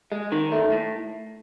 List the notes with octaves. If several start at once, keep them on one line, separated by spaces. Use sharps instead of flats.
G#3
D#3
A3
A2